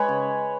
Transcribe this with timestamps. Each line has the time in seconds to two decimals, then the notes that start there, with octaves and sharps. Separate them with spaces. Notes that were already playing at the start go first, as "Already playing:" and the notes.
Already playing: G#3 B4 C#5 G#5
0.09 C#3